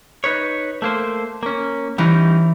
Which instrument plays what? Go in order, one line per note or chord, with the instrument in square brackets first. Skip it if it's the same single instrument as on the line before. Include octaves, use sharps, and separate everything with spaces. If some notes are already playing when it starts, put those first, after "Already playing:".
[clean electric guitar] D#4 B4 C#5
A3 A#3 C5
A#3 C#4
[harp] E3 [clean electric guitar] G3 C#4 D#4